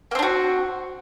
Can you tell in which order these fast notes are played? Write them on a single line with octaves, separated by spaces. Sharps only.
A#3 C4 D4 F#4